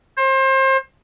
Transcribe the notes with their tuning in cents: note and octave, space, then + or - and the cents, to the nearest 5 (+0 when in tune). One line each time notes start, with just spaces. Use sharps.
C5 +30